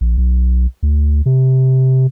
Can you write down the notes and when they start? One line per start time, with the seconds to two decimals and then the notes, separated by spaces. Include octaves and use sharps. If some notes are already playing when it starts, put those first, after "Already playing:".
0.01 A#1
0.18 B1
0.83 D2
1.26 C3